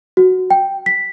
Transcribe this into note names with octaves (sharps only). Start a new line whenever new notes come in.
F#4
G5
B6